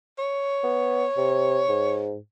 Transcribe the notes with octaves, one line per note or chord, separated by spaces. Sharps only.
C#5
B3
C3
G#2